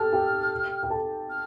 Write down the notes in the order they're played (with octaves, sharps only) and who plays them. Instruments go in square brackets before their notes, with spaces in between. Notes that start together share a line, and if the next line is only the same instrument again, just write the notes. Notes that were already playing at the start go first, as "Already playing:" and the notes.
Already playing: [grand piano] G4 A4 G5 A5 [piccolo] F6
[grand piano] G4 G5
G5
A4 A5
[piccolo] F6